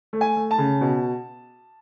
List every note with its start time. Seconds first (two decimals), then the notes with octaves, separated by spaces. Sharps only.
0.13 A3
0.21 G#5
0.37 A3
0.51 A5
0.58 C#3
0.81 B2